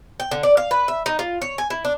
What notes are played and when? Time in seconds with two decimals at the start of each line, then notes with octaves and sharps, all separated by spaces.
0.20 G5
0.31 D3
0.43 D5
0.57 F5
0.71 B4
0.88 E5
1.06 D#4
1.19 F4
1.42 C#5
1.58 G#5
1.70 E4
1.85 D4